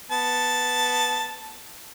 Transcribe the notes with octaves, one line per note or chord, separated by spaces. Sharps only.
B3 A5